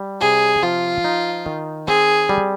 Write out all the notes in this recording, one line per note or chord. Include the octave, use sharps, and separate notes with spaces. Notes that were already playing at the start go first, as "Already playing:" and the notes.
Already playing: G3
C3 G#4
F3 F4
D#4
D#3
C4 G#4
G3